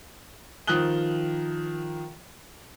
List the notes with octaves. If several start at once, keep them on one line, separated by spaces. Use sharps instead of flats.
D#3 F3 D#6 F#6 G7